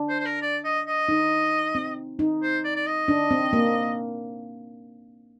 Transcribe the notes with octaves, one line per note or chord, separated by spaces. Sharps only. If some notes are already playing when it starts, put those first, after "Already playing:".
Already playing: D4
C5
C5
A#4
D5
D#5
D#5
D#4
C4
D#4
C5
D5
D5
D#5
D4
C4
A#3